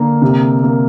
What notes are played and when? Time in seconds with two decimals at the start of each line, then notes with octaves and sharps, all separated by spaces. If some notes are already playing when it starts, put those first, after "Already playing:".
Already playing: D3 A#3 A#4
0.22 C3
0.63 A#3